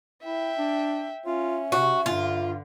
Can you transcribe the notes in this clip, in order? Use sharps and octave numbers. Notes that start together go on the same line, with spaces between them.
E4 E5 G5
D4
C#4 F4 E5
C3 F#4
G2 D3 F4